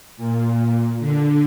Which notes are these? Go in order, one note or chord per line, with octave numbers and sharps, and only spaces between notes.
A#2
D3